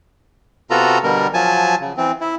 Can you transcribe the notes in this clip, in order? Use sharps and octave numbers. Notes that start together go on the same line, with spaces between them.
C3 B3 F4 F#4 A4 A#5
B2 D3 G3 A#4
F3 F#3 G#5 A5
C#3
E3 C4
E4